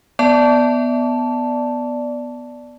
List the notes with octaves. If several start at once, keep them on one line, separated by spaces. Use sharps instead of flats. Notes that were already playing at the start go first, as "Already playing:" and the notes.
B3 D5 A5